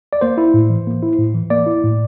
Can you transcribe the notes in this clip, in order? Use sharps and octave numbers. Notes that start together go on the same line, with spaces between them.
D5
A#3 C5
E4
A2
E3
A#3
E4
A2
E3
A#3 D5
E4
A2